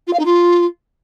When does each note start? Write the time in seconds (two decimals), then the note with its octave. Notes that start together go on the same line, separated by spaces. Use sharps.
0.07 F4
0.13 F5
0.19 D#4
0.25 F4